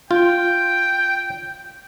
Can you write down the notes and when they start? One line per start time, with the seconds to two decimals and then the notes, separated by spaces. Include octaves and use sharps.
0.11 F4 G5